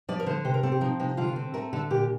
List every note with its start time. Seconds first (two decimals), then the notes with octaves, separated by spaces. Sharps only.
0.09 F3 D5
0.20 A#4
0.26 D3 C5
0.45 C3 C5
0.54 A#4
0.63 C4 A4
0.72 G4
0.81 F3 D#4
1.00 C3 D#4
1.17 D3 F4
1.36 C4
1.54 A3 A#4
1.73 D3 A4
1.90 A#2 G4